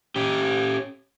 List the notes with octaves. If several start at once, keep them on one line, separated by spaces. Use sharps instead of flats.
C#4 G4